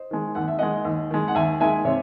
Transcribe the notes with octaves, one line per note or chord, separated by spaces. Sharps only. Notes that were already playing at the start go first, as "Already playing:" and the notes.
Already playing: C5 D#5
D#3 G#3
D#2 F#5
E5
D#3 G#3 D#5 F#5
D#2
D#3 G#3
F#5
D#2 E5 G#5
D#3 G#3 E5 G#5
C3 C#5 E5